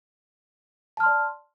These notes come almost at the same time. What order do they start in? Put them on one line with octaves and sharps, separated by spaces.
A5 F6 C6 D5